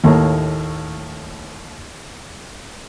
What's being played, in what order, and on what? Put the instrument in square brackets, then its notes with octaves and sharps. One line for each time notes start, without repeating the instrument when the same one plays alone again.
[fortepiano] D#2 A2 A3 A#3